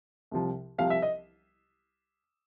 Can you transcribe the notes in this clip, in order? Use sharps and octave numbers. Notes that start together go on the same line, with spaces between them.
C2 C3 F3
C2 C3 F3 F5
E5
D#5